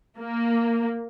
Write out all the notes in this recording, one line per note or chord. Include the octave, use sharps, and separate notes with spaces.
A#3